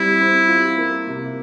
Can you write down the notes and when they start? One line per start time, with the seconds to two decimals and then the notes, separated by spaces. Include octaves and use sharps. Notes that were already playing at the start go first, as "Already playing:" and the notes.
Already playing: G3 C4 E4
0.20 C4
0.48 F4
0.78 A#3
1.07 C3